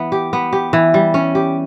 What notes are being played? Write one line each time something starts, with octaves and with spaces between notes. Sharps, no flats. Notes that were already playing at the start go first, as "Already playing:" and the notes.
Already playing: E3 B3
G4
B3
G4
E3
G3
C#4
G4